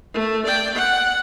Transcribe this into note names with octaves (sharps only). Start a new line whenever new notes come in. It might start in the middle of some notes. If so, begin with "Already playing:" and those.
A3
D5 G5
F#5